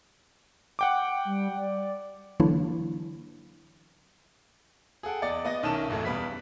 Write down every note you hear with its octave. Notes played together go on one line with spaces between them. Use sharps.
F#5 G5 D6
G3
D5
D3 E3 F#3 A#3 D4 E4
G#4 A4 F#5 G5
E2 D5 D#5 A6 C#7
B3 D#5 A#6
B1 D#3 C#4 E4 A5 E7
D1 A1 F#2 E3 A3
E2 B2 G3 B4 F5 B6